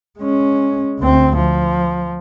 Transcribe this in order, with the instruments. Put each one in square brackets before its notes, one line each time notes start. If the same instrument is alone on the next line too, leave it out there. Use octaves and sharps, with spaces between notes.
[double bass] G#3 C#4
D2 C4
F3